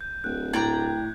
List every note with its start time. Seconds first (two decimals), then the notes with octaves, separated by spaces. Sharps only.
0.01 G6
0.24 D1 F#6
0.53 A2 D5 G5 A#5 G#6